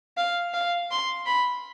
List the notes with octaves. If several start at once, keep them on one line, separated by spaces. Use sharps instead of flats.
F5
F5
C6
B5